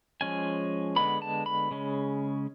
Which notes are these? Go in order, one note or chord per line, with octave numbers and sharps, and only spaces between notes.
F3 G#3 C#4 G#5
D3 G#3 B3 B5
A5
B5
C#3 G#3 C#4